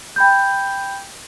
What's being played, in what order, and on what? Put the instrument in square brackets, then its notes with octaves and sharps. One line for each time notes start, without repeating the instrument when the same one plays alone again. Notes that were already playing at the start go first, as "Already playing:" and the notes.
[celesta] G5 B5 G6